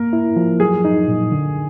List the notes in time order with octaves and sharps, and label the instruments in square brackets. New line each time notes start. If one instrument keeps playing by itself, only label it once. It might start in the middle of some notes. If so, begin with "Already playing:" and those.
Already playing: [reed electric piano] A#3 [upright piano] A#4
[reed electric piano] E4
F3
[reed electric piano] F#3 [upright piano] G#4
[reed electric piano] D#4
A#2
D3